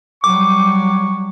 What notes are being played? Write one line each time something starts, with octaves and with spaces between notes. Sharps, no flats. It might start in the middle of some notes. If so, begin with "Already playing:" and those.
F#3 G3 C#6 D6